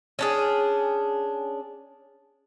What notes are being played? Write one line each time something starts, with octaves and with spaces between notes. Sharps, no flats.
C#4 D4 G#4